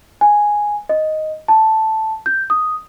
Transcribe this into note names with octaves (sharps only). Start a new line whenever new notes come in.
G#5
D#5
A5
G6
D#6